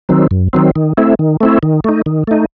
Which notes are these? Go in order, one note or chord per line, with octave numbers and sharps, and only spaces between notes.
D#3 F#3 C4
F#2
D#3 F#3 C4
D#3
A3 C4 E4
D#3
A3 C4 E4
D#3
A3 D#4
D#3
A3 D#4